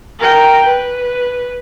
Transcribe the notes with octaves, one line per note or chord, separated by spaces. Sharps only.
A#4 G5
B4